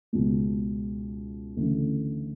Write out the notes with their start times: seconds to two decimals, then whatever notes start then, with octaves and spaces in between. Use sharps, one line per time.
0.13 C#2 B2 G#3
1.56 D2 C#3 E3 A3